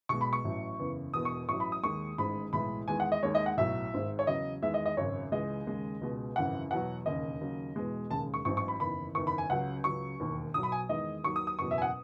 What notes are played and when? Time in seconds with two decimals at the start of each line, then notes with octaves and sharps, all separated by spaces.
0.09 B1 B2 G#3 C#6
0.21 B5
0.33 C#6
0.44 A1 A2 F#3
0.79 F#1 E2 C#3 E3
1.14 E1 E2 B2 D#6
1.25 C#6
1.49 A1 A2 F#3 C#6
1.60 B5
1.72 D#6
1.83 D#2 D#3 G#3 C#6
2.18 A1 G#2 D#3 G#3 B5
2.53 B1 A2 E3 G#3 B5
2.88 E2 D#3 G#3 G#5
3.00 F#5
3.12 D#5
3.23 D#2 D#3 G#3 C#5
3.35 D#5
3.46 F#5
3.57 B1 A2 F#3 E5
3.93 G#1 G#2 D#3 G#3
4.19 C#5
4.27 E2 C#3 F#3 D#5
4.62 E2 D#3 G#3 E5
4.74 D#5
4.86 D#5
4.97 G#1 F#2 C#3 C#5
5.32 C#2 C#3 E3 G#3 D#5
5.66 D#2 C#3 G#3
6.01 C#2 B2 G#3
6.36 G#1 F#2 C#3 E3 F#5
6.71 E2 B2 F#3 F#5
7.05 E1 D#2 C#3 D#5
7.41 D#2 C#3 F#3
7.76 E2 B2 G#3
8.10 E1 D#2 C#3 G#3 A5
8.34 C#6
8.45 A1 G#2 F#3 C#6
8.57 C#6
8.68 B5
8.80 F#1 E2 D#3 B5
9.15 F#1 E2 D#3 C#6
9.27 B5
9.38 G#5
9.50 C#2 C#3 F#3 F#5
9.84 C#2 C#3 F#3 C#6
10.20 E1 D#2 D#3
10.54 B1 B2 F#3 D#6
10.63 B5
10.72 G#5
10.89 E2 D#3 G#3 D#5
11.24 D#2 D#3 F#3 C#6
11.36 D#6
11.47 D#6
11.59 F#1 E2 B2 F#3 C#6
11.71 E5
11.78 G#5
11.82 F#5